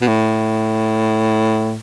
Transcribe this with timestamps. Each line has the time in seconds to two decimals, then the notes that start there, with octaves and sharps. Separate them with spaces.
0.02 B2
0.08 A2